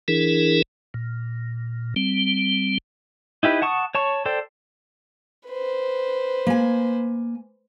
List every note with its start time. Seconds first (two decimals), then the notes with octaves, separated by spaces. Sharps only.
0.08 E3 D4 E4 G#4 A#4
0.94 A#2
1.96 G3 C4
3.43 D#4 E4 G4 B4
3.62 F#5 A5 C#6 D#6
3.95 C#5 A5 C#6
4.26 A4 C5 D5 G5
5.48 B4 C5
6.47 A#3 G#5